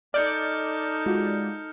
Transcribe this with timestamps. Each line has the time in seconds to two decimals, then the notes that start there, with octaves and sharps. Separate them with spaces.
0.14 D#4 A4 D5 D#5 F6 G6 C#7
1.06 G#3 F4 F#4